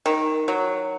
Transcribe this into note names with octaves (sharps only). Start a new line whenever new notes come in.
D#3
F#3